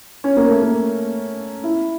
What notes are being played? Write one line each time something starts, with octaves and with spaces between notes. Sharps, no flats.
C#4
A#3
A3
A#3
E4